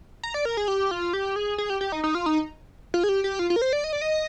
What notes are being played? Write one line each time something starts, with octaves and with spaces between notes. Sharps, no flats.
A#5
D5
A#4
G#4
G4
F4
G4
G#4
G#4
G4
G4
D#4
D#4
F4
D#4
F4
G#4
G4
G4
F4
F4
A#4
C5
D5
D#5
D5
D#5